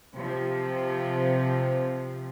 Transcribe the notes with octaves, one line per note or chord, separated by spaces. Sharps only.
C3 F3